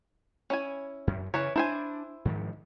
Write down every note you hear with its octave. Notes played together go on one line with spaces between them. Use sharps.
C#4 E4 G#5
F#2
C#3 E3 B4 C#5
D4 E4 C5 G#5
G#2 D#3 F3